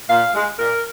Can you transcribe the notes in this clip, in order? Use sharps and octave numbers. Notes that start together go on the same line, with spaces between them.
A#2 F5
G#3
A#2 A#4